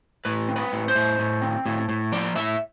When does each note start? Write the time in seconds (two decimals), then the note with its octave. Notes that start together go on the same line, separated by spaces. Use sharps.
0.25 A2 B4
0.48 C4
0.56 B4
0.72 A2
0.88 C5
0.95 A2
1.19 A2
1.42 C4
1.66 A2
1.89 A2
2.12 F3 D5
2.35 A2 E5